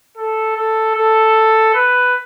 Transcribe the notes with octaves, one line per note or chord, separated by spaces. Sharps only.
A4
A4
A4
B4